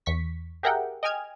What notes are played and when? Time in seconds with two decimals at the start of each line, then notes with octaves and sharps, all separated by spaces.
0.06 E2 C#6 B6
0.63 G4 G#4 A#4 E5 F#5 G5
1.03 D#5 G5 G#5 F6 G#6